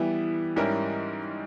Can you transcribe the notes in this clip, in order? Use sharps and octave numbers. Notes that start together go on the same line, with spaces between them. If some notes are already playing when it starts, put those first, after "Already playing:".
Already playing: E3 G3 B3 E4
G#2 G3 C#4 E4 A#4